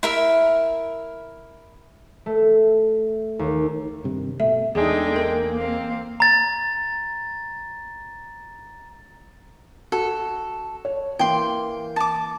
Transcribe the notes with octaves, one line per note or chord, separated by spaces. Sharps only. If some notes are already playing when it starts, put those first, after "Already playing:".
E4 A#4 E5
A3
D#2
G2 C3 D#3
B2 A3 E5
E2 G#3 D4 D#4 G#4 A4 G5
A#3 A#4
C4 F5
A#5 A6
F#4 A4
C#5
E3 A#3 G5 C6
A5 D6